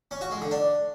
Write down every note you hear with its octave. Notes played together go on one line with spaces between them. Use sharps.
C#4
F#4
G#3
D3
D4